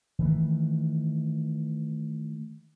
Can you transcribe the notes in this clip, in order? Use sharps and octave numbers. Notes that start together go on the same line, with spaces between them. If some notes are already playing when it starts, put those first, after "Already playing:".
D#3 E3 A3